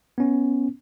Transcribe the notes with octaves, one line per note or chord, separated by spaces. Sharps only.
B3 C#4